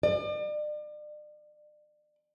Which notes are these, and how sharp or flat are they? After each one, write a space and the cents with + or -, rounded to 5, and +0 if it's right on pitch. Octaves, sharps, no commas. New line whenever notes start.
D5 +40